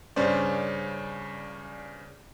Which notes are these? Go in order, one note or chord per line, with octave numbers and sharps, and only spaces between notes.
G2 C#3 C#4 C5 D5